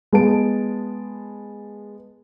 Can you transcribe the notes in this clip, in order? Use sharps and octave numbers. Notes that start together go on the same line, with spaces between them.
G#3 B3 A5 D7